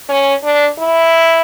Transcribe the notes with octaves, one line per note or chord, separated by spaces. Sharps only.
C#4
D4
E4